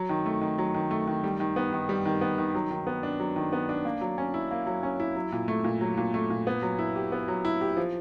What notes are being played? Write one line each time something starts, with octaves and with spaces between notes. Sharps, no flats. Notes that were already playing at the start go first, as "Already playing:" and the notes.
Already playing: F#3
D#3
A3
D#3
F#3
D#3
A3
D#3
G3
D#3
B3
D#3
G3
D#3
B3
D#3
F#3
D#3
B3
D4
F#3
D#3
B3
D4
A#3
F#3
C#4
E4
A#3
F#3
C#4
E4
F#3
A#2
A3
A#2
F#3
A#2
A3
A#2
B3
F#3
E4
G4
B3
F#3
E4
G4
F3